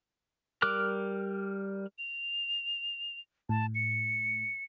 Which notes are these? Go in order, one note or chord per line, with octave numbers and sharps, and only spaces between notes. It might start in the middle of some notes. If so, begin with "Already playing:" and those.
G3 A#4 D6 F6 F#6
F7
A2 A5
C#7